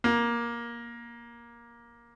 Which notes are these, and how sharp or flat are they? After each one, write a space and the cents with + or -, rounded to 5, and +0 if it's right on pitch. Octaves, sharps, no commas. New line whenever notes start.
A#3 +15